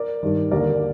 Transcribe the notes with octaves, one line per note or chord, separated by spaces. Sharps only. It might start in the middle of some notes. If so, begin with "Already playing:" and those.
Already playing: A#4 D5
G2 D#3
D#2 D3 A#4 D5